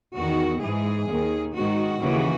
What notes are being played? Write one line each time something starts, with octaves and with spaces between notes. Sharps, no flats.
E2 D#3 F#4
G#2 E3 G#4
D#2 D#3
G#2 D#3 F#4
D#2 C#3 E3